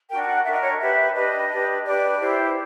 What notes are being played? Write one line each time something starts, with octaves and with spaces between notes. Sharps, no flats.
D4 F#4 A#4 G5
G5
F#5
D4 F#4 A#4 E5
D#5
C#5
D4 G4 B4 E5
D4 G4 B4 D#5
D4 G4 B4
D4 G4 B4 D5
E4 G4 C5